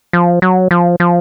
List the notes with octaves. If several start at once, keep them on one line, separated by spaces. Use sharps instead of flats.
F3
F#3
F3
F3